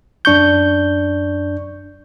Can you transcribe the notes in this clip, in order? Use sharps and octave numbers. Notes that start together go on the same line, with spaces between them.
F#2 D4 C#6 G6